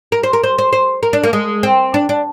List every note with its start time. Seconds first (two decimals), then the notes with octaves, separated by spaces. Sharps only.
0.12 A#4
0.23 C5
0.33 A#4
0.44 C5
0.58 C5
0.73 C5
1.03 A#4
1.13 D4
1.23 A#3
1.33 G#3
1.63 C4
1.94 D4
2.09 D4